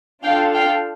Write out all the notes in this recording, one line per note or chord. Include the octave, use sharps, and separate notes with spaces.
D4 F4 A4 F5 G5
F5 G5